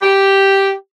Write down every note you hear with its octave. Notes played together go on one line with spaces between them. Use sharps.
G4